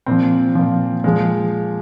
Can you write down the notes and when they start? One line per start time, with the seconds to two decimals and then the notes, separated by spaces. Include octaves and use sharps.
0.06 A#2 F3 C4
0.55 A#2 F3
1.04 A#2 F3 G#3